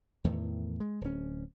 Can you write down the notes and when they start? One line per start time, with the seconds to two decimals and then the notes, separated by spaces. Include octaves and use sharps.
0.24 E2 A2 D#3 E3
0.80 G#3
1.01 D1 C#4